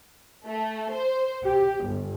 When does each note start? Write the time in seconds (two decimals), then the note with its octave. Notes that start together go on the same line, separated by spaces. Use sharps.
0.47 A3
0.94 C5
1.44 G4
1.85 G1